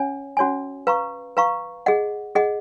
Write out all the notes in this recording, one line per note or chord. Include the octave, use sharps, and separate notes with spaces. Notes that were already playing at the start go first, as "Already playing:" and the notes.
Already playing: C#4 C#5 G#5
C#4 F#4 C#5 G#5
B4 F5 A#5 C#6
B4 F5 A#5 C#6
G#4 D#5 F#5
G#4 D#5 F#5